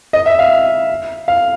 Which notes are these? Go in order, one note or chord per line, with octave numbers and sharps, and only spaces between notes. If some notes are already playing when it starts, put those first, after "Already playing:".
D#5
E5
F5
F5